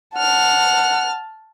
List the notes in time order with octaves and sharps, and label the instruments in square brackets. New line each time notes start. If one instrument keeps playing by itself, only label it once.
[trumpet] F#5 [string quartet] A5 F6